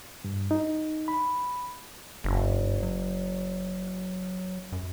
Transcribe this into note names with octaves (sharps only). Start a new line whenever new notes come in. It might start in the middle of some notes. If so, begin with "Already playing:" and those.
G2
D#4
B5
F#1 G2
F#3
F#2